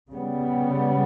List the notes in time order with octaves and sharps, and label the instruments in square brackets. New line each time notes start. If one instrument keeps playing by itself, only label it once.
[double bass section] C#3 G3 B3